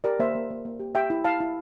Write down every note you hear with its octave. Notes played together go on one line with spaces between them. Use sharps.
G4 A#4 D5
A#3 C5 E5
A#3
A#3
A#3
G4
G4 E5 G5
E4
E4 F5 A5
E4